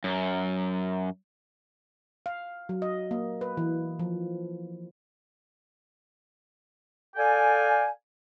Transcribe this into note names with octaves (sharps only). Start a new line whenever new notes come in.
F#2
F5
F#3
D#5
A#3
B4
E3
F3
A4 D5 F5 G5 G#5